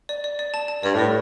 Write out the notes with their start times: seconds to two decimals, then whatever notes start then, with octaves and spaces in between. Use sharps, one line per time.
0.09 D5
0.24 D5
0.39 D5
0.54 A5
0.68 A5
0.83 G2 D5
0.95 A2 D5